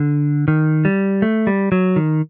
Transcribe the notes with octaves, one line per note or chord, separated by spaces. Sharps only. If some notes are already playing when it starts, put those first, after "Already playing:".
Already playing: D3
D#3
G3
A3
G3
F#3
D#3